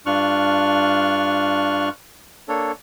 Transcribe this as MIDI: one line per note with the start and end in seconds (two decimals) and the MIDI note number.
0.06 1.89 43
0.06 1.89 62
0.06 1.89 65
0.06 1.89 85
0.06 1.89 89
0.06 1.89 90
2.48 2.72 58
2.48 2.72 62
2.48 2.72 69
2.48 2.72 73